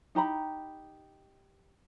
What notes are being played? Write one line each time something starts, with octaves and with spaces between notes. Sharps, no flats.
D#4 G4 A#5 B5